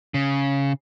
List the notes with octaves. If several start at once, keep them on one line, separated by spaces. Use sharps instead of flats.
C#3